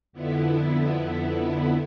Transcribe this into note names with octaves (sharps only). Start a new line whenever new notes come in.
F2 D3 B3 E4